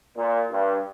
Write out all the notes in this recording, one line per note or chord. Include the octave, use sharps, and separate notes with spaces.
A#2
G2